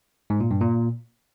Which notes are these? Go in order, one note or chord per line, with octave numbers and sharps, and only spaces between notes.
G#2
A#2
G2
A#2